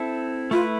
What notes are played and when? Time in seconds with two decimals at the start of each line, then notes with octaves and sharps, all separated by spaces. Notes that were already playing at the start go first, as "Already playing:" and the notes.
Already playing: C4 E4 A4
0.51 A3 E4 F4 B4